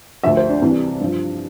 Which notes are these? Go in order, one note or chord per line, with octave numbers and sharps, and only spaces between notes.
D2 D3 F3 E5
C5
D4
C2 C3 E3
G2 F3